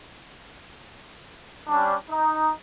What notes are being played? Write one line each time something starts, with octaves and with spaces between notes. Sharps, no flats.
G3 C#4 D4
D#4